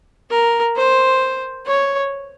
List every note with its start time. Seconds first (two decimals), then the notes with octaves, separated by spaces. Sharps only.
0.30 A#4
0.76 C5
1.66 C#5